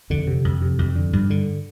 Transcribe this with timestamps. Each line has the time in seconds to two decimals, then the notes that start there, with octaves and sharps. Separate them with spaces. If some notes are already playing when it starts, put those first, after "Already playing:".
0.10 F2 D3
0.27 C3
0.45 F2
0.62 C3
0.79 F2
0.96 D3
1.13 G2
1.30 D3